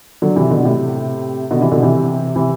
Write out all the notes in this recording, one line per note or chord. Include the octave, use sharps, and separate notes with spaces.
D3 F#3
C3 E3
B2 D3
A2 C3
B2 D3
C3 E3
B2 D3
C3 E3
C3 E3